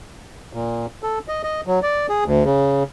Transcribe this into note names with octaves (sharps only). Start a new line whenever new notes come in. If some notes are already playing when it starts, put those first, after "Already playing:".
A#2
A4
D#5
D#5
F#3
D5
G#4
D2
C#3